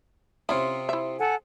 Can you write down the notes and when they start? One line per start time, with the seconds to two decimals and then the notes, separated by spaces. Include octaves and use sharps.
0.49 C3 C#4 E4 F4 D#6
0.89 E4 E5
1.19 A4 F#5 G#5